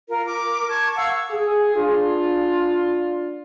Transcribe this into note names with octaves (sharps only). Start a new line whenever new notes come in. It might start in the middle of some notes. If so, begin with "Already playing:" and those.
F4 A#4
A#4 D6
A5 C#6 D6 G#6
F5 F#5 C#6 E6
G#4
D4 F4